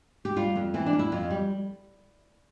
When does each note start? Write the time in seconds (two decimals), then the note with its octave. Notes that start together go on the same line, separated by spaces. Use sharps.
0.25 G4
0.36 G3 F4
0.55 F2
0.74 E3 C4
0.86 D4
0.93 F2
0.99 E4
1.12 F2 F4
1.30 G3